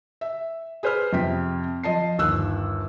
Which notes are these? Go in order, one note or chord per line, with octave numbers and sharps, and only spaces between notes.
E5
G#4 B4 C5 B5 F6
F2 C3 G5 B6
F3 D#5 A5 C7
G1 D#2 E6 F#6